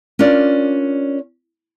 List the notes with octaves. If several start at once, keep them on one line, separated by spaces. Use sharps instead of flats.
C#4 D4 F4 A#4 D5